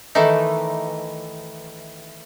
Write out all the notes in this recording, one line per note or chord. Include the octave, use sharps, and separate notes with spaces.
D#3 E3 A3 D#4